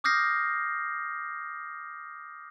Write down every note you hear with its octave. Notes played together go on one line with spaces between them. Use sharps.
D6 D#6 F6 G6 A#6 C7